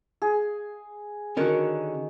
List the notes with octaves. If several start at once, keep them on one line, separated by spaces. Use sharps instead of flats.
G#4
D3 D#3 C#4 F#4 A#4